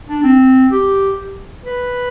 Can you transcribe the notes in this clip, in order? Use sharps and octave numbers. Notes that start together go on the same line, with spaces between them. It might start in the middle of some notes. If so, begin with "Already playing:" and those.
D4
C4
G4
B4